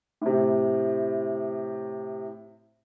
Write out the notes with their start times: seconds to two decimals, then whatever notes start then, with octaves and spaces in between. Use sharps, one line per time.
0.21 A2 C3